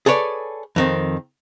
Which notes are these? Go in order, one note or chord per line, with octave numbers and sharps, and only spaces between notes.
G#4 A4 B4 C#5 D5
F2 D#3 C4